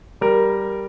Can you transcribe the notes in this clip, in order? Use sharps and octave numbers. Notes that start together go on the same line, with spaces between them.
G3 A#4